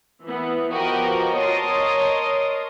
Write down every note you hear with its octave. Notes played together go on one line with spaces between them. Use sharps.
E3 B3
F3 B3 F#4 G4 A#4 D#5
A#4 C#5 D#5 A5 C6 D#6